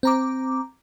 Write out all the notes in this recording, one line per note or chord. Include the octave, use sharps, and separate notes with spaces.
C4 A#5 D6